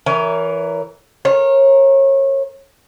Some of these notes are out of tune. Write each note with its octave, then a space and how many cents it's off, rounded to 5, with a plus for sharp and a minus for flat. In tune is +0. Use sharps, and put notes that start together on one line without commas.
E3 +0 A#4 +0 C#5 +30
A#4 +0 C#5 -30